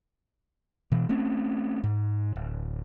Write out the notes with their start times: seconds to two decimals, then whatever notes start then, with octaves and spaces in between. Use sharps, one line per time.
0.92 B2 E3
1.09 A3 C4 C#4
1.84 G#2
2.36 D1